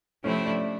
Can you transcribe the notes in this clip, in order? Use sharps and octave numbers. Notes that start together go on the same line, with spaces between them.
C3 F3 A3 C4 C#4 E4
D4